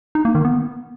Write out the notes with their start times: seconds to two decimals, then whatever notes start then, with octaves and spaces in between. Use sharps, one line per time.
0.15 D#4
0.25 A#3
0.35 D#3
0.45 B3